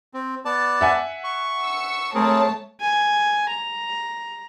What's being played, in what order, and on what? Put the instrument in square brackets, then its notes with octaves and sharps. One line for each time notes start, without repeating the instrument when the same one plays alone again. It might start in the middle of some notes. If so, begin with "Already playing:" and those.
[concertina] C4
B3 D5 A5
[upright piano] E5 F#5 G#5
[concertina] C#6
[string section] E6 C#7
[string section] A3 C#5 A5 [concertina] C4 G#4 A#4
[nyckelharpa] G#5
A#5